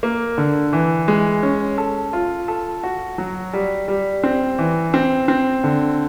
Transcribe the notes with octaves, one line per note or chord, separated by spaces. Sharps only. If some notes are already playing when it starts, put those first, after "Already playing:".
A#3
D3
E3
G#3
C#4
A4
F4
A4
F#4
F#3
G3
G3
C4
E3
C4
C4
D3